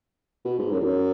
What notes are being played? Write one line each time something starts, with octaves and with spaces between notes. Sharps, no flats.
B2
G#2
F#2
E2
F#2